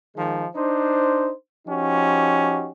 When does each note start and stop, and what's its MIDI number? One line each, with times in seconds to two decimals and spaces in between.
0.16 0.47 51
0.16 0.47 53
0.16 0.47 56
0.56 1.32 62
0.56 1.32 63
0.56 1.32 72
1.68 2.72 53
1.68 2.72 61
1.68 2.72 63
1.68 2.72 66
1.68 2.72 67